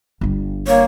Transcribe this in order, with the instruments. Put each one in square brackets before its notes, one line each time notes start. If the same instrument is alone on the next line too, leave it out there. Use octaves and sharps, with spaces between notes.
[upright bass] G1 G3
[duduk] A#3 [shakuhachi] C#5